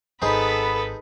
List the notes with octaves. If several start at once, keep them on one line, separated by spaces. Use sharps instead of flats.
G#1 B3 D#4 G#4 A4 B4 C5